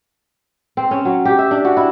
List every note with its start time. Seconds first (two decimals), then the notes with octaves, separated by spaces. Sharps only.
0.77 C4
0.91 C#4
1.05 F#3
1.25 G4
1.38 E5
1.51 D4
1.65 F#4
1.77 E4